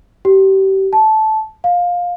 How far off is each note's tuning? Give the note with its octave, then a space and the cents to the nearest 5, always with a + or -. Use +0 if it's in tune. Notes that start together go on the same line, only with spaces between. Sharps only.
G4 -30
A5 -15
F5 +15